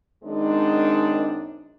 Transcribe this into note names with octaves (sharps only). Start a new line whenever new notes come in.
F#2 D#3 G#3 C4 D4 D#4